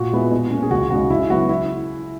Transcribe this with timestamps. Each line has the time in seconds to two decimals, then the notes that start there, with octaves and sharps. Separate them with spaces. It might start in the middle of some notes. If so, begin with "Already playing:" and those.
Already playing: A#2 F#4
0.12 G#3 B3 E4
0.31 B2
0.51 A#3 C#4
0.63 G#4
0.71 C#2 F#4
0.91 C#3 G#3 D#4 F#4
1.10 C#3 E4
1.30 F#3 B3 E4 F#4
1.49 E4